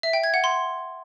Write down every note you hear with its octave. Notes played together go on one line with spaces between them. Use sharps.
E5
G5
G#6
F#5
C6